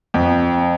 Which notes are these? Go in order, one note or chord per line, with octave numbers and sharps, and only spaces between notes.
F2